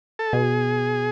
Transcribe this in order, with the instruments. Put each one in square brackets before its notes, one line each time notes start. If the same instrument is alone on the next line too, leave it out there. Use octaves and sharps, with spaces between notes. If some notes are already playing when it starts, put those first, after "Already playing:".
[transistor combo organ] A4
[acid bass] B2 [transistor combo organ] G#4